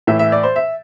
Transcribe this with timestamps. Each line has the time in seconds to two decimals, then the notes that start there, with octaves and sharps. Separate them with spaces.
0.07 A2 E3 E5
0.19 E5
0.32 D5
0.43 C5
0.56 E5